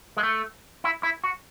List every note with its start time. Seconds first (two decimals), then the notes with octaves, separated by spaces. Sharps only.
0.17 G#3
0.23 A3
0.84 E4
1.03 E4
1.24 F#4